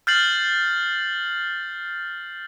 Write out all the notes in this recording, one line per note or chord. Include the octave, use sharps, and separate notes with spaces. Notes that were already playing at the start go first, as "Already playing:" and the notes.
F6 G6 A6 C7 F#7